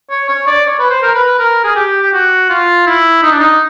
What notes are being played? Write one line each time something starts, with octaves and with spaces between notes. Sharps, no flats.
C#5
C#5
D5
C#5
B4
C5
A#4
B4
A#4
G#4
G4
G4
F#4
F4
E4
D#4
D4
D#4